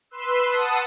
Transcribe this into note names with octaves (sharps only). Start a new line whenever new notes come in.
B4 C6 E6
F#5 A5 D#6